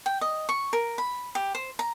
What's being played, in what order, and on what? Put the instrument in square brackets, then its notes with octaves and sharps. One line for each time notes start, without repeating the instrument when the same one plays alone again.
[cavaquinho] G5
D#5
C#6
A#4
B5
G4
C5
A#5